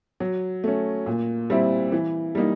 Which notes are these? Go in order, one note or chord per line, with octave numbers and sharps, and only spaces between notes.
F#3
A3 C#4
A#2
G3 C4 E4
E3
G3 A#3 D#4